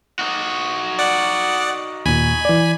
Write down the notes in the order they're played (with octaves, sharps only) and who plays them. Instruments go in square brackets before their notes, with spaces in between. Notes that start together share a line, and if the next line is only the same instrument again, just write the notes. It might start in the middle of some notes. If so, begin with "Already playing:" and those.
[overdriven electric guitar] D#4 F#4
[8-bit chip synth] D5 F#5
[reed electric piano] D#2 A#2 [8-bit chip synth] G#5 B5
[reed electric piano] E3 D5